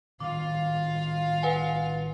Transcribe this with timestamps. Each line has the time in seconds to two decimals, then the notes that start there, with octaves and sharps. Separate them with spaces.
0.20 A1 D#3 G3 F4 F5 D6
1.43 B4 F#5 G#5